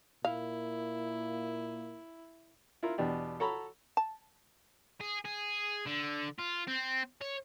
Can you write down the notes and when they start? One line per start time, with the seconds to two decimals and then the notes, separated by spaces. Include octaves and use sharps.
0.25 A#2 A#3 E4 F5
2.83 E4 F4 A#4
2.98 E2 B2 D4 G4
3.40 F#4 A4 C#5 A#5 B5
3.97 A5
5.01 G#4
5.25 G#4
5.86 D3
6.39 F4
6.67 C4
7.21 C#5